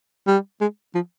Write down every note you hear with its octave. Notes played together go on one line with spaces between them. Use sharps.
G3
G#3
F3